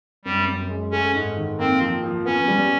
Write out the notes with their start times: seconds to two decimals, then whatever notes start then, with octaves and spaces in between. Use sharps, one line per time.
0.25 F#2 G3
0.48 F#2
0.69 G#3
0.92 A3 C#4
1.15 G#2
1.37 D#3
1.59 A#3 C4
1.81 F3
2.03 F3
2.26 B3 C#4
2.48 G3